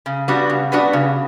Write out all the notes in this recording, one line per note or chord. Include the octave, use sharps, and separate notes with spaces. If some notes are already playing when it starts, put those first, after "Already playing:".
C#3
G3 B3 D4 F#4
C#3
G3 B3 D4 F#4
C#3